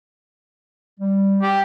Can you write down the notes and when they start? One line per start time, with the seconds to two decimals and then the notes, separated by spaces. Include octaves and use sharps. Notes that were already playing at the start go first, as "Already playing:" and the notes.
1.00 G3
1.42 G4